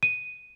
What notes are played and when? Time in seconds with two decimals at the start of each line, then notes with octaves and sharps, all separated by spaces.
0.03 D#7